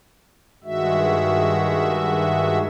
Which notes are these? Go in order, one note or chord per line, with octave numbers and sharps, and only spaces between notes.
G2 D#3 G#3 F#4 E5